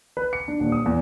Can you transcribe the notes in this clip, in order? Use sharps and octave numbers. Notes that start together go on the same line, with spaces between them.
B4
C#7
D4
D#1
D#6
E2